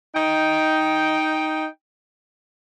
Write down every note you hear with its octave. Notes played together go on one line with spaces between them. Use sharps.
D#4 G5